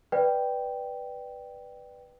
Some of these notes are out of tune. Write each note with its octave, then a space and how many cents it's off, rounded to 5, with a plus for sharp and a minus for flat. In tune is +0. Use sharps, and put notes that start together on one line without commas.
B4 +0 D5 +15 G5 +0